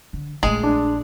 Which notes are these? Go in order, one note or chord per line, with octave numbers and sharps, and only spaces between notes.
D3
A#1 G#3 A3 G#4
D4